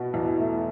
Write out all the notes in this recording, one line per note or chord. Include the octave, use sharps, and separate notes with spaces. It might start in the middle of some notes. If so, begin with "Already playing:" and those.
Already playing: B2 F#4
E2
A3